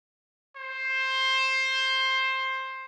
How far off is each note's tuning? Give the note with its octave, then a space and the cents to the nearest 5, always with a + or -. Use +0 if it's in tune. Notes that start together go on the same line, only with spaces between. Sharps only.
C5 +15